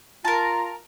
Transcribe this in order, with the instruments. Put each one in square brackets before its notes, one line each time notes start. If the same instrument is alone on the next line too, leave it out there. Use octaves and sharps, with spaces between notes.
[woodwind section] F4 A#5 [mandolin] A#4 A5